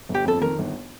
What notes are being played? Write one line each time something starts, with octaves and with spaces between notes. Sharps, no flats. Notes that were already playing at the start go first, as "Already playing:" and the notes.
G1
G4
F2 A4
D#3 A#4
G1